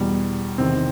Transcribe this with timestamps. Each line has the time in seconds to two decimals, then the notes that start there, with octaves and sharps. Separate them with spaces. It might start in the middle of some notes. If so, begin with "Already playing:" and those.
Already playing: E2 B2 G3
0.58 E2 C3 D#3 C4